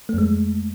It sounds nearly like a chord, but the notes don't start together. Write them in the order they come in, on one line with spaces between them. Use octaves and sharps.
A3 F2 G#3